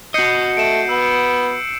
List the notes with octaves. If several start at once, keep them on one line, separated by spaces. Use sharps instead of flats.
F#4 D#5 G6 C7 C#7
A3 D7 E7
B3 E6